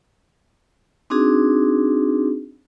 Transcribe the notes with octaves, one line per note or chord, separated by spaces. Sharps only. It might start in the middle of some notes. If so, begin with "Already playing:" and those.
C4 D4 D#4 F#4 G#4